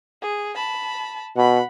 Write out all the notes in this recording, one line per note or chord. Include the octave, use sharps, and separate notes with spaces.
G#4
A5 B5
B2 F#5 B5